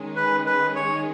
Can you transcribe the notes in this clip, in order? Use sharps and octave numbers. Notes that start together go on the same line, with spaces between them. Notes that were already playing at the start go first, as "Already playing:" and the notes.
Already playing: D#3 G#3 C#4 G#4
B4
B4
C#5